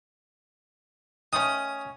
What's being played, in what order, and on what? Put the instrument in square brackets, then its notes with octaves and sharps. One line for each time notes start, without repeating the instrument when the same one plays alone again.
[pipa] D#3 A3 C#4 [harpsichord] D#6